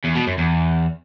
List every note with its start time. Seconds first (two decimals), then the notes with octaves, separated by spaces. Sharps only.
0.04 E2
0.15 B2
0.27 F#2
0.38 E2